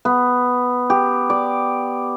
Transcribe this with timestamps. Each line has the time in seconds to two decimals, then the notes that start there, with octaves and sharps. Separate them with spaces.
0.05 B3
0.90 G4
1.30 D5